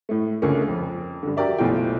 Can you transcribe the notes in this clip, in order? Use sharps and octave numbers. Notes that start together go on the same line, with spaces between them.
A2 A3
C#2 D3 A3 A#3 C#4
F2
G2 D3
F#4 G4 A#4 D5 E5
F#1 B1 A3 E4 F4 G5